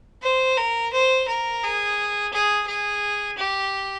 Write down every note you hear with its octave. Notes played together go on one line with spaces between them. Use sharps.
C5
A#4
C5
A#4
G#4
G#4
G#4
G4